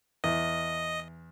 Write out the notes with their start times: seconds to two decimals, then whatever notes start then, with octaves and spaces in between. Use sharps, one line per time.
0.24 E2 D#5